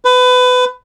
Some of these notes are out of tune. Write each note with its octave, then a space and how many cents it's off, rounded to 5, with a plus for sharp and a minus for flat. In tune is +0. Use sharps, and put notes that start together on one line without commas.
B4 +25